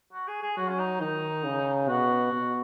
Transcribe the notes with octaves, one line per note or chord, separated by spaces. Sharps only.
F#4
G#4
G#4
F#3 F#4
C#4
D#4
D#3 D#4
C#3
B2 F#4
B2